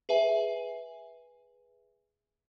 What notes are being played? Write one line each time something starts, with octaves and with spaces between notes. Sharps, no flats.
G#4 B4 E5 G#5